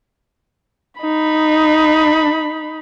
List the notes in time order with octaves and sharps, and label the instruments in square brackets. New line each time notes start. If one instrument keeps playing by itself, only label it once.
[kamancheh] D#4 B5